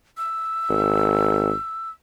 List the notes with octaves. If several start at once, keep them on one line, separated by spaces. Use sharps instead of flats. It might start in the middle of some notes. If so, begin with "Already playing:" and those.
E6
G#1